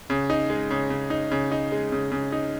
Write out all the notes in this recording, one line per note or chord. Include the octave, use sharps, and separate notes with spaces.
C#3
D#4
G#3
C#3
C#3
D#4
C#3
D#4
G#3
C#3
C#3
D#4